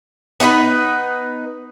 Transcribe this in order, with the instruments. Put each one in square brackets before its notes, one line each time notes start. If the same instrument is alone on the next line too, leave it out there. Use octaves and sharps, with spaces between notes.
[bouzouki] B3 D#4 G4 B4